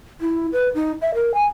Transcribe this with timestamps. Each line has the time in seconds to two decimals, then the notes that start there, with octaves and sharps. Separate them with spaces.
0.21 E4
0.53 B4
0.75 D#4
1.02 E5
1.14 A#4
1.34 G#5